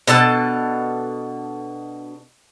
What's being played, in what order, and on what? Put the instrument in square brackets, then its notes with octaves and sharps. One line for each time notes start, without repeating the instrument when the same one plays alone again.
[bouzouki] B2 D4 A4 A5